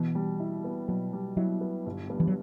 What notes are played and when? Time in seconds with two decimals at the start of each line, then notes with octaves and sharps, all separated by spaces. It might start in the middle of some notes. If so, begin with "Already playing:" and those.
Already playing: B2 E3
0.15 G3
0.40 E4
0.64 B3
0.88 B2 F#3
1.13 G3
1.37 F#3 E4
1.61 B3
1.86 G1
2.10 G2
2.20 E3
2.27 F#3